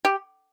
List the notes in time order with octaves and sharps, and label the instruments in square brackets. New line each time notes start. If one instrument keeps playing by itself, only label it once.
[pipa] G4